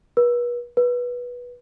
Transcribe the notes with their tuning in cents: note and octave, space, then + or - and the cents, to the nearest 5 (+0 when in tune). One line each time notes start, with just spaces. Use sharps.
B4 -40
B4 -15